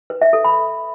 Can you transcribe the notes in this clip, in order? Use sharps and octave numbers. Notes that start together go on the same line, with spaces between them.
B4
E5
A4
B5